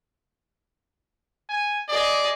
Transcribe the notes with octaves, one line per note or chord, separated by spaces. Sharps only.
G#5
G#4 D5 D#5